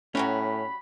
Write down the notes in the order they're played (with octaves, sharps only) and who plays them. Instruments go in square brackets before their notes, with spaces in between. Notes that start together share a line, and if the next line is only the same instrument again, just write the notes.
[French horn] A2 [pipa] F#3 G3 F#4 [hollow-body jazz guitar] C#4 [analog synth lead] B5